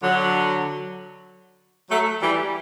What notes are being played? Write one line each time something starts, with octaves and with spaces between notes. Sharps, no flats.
D3 F#3
F#3 A3
E3 G3